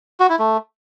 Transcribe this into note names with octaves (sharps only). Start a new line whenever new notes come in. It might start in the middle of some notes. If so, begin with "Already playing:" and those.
F#4
E4
A3